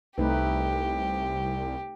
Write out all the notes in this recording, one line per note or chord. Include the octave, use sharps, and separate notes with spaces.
C2 A3 D#4 G4 B4